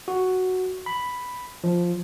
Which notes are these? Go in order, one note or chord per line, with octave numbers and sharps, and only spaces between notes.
F#4
B5
F3